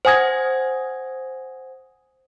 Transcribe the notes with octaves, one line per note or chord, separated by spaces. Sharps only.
C5 F#5 G#5 D#6 G#6 A#6